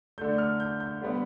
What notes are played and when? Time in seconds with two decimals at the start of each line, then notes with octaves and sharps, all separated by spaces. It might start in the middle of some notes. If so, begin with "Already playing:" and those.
0.18 A3 G6
0.21 D3
0.38 F6
0.60 G6
0.80 G6
1.01 D3 G3 B3